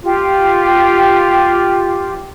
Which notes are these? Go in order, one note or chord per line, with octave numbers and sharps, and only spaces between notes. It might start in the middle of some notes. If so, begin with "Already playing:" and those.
F4 G4